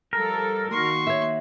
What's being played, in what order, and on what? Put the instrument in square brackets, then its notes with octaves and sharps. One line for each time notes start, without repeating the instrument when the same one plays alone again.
[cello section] F3 G3 A4 [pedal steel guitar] A#4
[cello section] D#3 A#3 F#4 [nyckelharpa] C6 C#6
[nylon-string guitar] C#5 E5